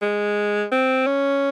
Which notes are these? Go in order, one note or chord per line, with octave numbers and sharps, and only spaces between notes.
G#3
C4
C#4